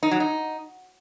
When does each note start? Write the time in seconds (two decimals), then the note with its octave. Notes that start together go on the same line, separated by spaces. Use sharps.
0.03 D#4
0.11 F#3
0.20 D#4